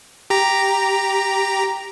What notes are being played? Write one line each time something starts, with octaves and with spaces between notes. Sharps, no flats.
G4 A#5